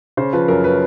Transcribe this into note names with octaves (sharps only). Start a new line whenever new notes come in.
C#3 C5
F3 B4
F#2 A#4
B4